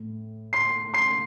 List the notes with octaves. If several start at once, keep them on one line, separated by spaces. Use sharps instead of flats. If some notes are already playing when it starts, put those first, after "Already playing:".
Already playing: A2
C6 C7
C6 C7